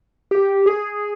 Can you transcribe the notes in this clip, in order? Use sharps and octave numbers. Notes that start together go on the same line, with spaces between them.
G4
G#4